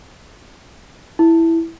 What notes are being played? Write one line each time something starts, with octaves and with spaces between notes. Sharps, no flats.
E4